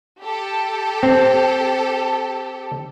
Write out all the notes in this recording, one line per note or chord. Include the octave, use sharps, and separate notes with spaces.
G4 A4
C4